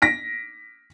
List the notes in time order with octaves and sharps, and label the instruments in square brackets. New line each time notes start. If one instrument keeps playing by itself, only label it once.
[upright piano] A#6 B6 D7